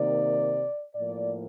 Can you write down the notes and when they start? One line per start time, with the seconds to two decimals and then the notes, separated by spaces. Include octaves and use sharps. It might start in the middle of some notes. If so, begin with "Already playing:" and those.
Already playing: C3 D#3 A#3 D5
0.95 A2 F3 A#3 D5